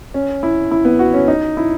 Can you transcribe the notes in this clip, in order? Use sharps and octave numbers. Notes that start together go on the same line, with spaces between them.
C#4
E4
E4
B3
F#4
C#4
D#4
E4